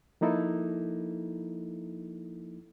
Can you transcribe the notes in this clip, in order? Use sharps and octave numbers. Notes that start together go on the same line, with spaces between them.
F3 A#3 D#4 E4 A4